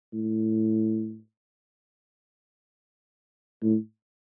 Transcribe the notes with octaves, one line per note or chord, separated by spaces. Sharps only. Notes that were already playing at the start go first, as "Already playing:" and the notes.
A2
A2